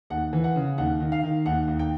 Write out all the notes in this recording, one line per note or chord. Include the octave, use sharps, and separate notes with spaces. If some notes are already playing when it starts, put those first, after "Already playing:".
D#2 F#5
E3
F#5
C#3
D#2 F#5
D#3
F5
D#3
D#2 F#5
D#2
G5